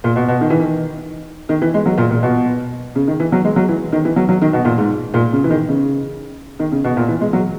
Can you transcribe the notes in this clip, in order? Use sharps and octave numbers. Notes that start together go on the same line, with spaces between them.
A#2
B2
B2
D#3
E3
D#3
D#3
E3
G#3
F#3
A#2
A#2
B2
C#3
D#3
E3
F#3
G#3
F#3
E3
D#3
E3
F#3
F#3
D#3
B2
A#2
G#2
A#2
C#3
E3
D#3
C#3
D#3
C#3
B2
A#2
E3
G#3
F#3